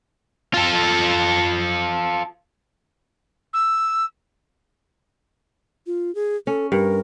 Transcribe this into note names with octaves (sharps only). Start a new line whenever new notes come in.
F4 A4
E6
F4
G#4
C#4 A4
G2 A#4